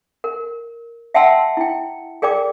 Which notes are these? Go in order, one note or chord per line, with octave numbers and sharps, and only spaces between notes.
A#4
E5 F#5 G5 A5 C6 E6
E4 G5
G#4 A#4 D5 G5 D6